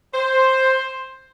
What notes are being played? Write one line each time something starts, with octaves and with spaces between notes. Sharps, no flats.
C5